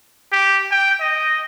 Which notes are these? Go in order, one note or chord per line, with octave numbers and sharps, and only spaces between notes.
G4
G5
D#5